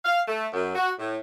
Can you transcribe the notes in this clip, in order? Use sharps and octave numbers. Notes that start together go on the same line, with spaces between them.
F5
A3
F#2
F#4
A2